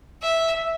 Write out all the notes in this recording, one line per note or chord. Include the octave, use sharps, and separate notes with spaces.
E5